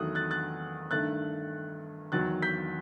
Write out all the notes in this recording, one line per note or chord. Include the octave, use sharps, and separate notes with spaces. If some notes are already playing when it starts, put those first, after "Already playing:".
Already playing: E2 D#3 F#3 A3 D#6 F#6
F#6 A6
F#6 A6
G2 D#3 A3 F#6 A6
E2 D#3 F#3 F#6 A6
G6 B6